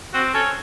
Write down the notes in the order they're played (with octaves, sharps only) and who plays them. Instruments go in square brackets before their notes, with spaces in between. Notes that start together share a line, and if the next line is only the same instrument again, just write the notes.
[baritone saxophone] C4 [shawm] F#4
[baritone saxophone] C#4 [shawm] A4